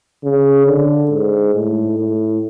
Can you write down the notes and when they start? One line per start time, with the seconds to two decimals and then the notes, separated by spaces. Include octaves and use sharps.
0.24 C#3
0.67 D3
1.11 G#2
1.55 A2
1.99 A2